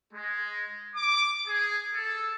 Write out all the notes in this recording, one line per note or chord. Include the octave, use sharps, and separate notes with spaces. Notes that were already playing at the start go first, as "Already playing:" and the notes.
G#3
D6
G#4
A4